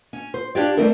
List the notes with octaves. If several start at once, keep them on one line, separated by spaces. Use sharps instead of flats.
C#4
C5
D4 F4 G4 C#5 D5
G3 A3 C4 A4 A#4